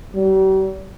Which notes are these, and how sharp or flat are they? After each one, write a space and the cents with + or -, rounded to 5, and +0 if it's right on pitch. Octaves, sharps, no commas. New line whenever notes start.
G3 -45